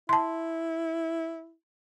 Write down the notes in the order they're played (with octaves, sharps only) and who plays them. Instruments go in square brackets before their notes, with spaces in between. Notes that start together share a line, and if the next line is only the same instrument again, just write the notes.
[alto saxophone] E4 [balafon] A5 C6